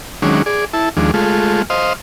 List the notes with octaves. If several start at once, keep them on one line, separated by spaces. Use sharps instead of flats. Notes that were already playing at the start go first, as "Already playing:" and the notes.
D#3 F#3 G#3 C#4 D4
G#4 D5
E4 A5
D#2 F3 G#3 D4
G#3 A3 F4
C5 D#5 F5